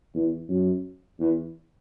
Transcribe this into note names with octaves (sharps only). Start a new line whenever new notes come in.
E2
F#2
E2